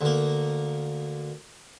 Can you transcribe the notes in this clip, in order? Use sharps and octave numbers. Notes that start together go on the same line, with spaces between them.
D2 A#3